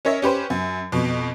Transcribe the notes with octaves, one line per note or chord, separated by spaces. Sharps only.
C#4 A#4 C#5 D#5 E5
C#4 G4 B4 C5
F#2
F2 B2